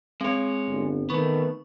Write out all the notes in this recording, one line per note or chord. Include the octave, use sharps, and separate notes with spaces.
G#3 C4 C#5
G1
D#3 A3 B3 C#6